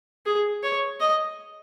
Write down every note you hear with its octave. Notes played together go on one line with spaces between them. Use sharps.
G#4
C#5
D#5